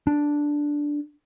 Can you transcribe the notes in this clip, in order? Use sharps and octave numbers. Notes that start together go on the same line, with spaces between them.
D4